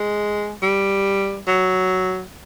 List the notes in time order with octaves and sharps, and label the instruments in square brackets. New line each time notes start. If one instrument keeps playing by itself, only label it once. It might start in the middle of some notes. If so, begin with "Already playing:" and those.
Already playing: [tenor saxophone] G#3
G3
F#3